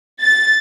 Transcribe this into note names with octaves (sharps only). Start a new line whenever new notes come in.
A6